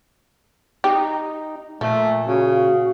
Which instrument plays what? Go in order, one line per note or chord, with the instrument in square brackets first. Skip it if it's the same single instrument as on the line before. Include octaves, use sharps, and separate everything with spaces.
[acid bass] D#4 [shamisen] G4
[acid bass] A#2 [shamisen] F3 [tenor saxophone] A3
[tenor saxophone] C#3 [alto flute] F#4